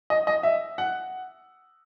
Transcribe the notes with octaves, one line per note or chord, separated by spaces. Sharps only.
D#5
D#5
E5
F#5